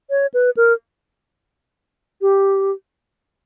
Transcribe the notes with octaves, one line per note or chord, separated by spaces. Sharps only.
C#5
B4
A#4
G4